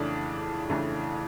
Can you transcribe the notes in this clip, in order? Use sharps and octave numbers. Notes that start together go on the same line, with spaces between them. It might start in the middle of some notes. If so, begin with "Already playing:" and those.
Already playing: F2 C#3 E3 A3 D4
F2 C#3 E3 A3 D4